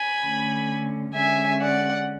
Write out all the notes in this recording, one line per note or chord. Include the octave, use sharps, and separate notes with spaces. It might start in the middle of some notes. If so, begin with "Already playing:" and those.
Already playing: G#5 B5
D3 A3 C#4
D3 G#3 C#4 E5 G#5
D5 F#5